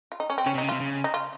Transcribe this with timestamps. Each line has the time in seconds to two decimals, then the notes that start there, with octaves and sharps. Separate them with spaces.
0.12 F4
0.20 D#4
0.30 C#4
0.38 C4
0.46 C#3 C#4
0.55 C3 D#4
0.63 C#3
0.69 C3 F4
0.80 C#3
1.04 D#4
1.14 F4